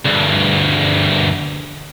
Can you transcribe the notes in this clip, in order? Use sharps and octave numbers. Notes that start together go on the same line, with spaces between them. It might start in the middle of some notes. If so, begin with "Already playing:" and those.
D2 G2